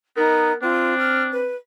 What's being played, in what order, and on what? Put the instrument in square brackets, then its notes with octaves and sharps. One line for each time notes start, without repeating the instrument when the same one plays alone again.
[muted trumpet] B3 [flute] D#4 [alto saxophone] A#4
[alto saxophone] C4 [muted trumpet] D4 [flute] F4
[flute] F6
B4